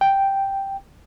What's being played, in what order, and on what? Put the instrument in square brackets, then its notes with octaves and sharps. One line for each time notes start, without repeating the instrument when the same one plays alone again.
[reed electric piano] G5